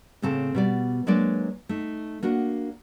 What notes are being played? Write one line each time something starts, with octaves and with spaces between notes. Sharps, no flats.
A2 C#3 C4 A4 A5
B2 G3 D5
F#3 G#3 A#3 D4 B4 D5
A3 D#4
A#3 D4 F#4